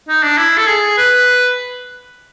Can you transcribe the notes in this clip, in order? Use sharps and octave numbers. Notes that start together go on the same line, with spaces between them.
D#4
D4
E4
A4
G#4
B4